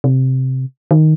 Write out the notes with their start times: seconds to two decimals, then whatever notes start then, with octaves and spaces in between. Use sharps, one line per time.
0.04 C3
0.91 D#3